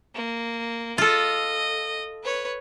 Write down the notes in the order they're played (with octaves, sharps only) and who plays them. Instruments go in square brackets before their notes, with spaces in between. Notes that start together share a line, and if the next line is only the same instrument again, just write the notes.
[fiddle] A#3
[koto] F4 A4 [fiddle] D#5
[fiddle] B4 C#5